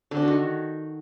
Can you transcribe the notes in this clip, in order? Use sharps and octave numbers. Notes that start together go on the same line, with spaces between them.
D3
D4
F#4
D#3